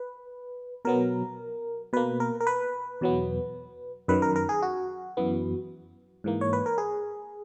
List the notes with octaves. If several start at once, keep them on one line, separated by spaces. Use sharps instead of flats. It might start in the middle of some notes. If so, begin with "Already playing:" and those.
Already playing: B4
B2 F#3 B3 A#4
B2 A#3 B4
A#4
A#4
B4
E2 B2 F#3 B3
F#2 D#3 F#3 B4
A#4
A#4
G#4
F#4
F#2 E3 B3
G#2 E3 A#3
C#5
B4
A#4
G#4